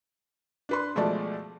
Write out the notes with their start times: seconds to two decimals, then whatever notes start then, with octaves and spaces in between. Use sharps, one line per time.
0.69 D4 B4 C6
0.95 B2 F3 G#3 A3 D5 A5